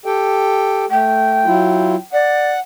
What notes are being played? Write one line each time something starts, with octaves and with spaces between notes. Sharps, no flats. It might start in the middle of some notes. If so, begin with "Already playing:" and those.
G4 A4 G5
A3 G5
F#3 E4 F4
D5 F#5